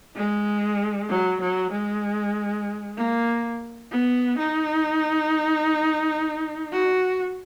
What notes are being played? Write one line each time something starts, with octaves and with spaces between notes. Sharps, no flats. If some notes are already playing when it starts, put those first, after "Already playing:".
G#3
F#3
F#3
G#3
A#3
B3
D#4
F#4